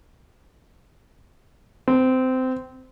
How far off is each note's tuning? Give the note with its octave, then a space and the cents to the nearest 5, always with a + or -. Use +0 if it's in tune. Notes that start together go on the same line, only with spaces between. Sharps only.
C4 -20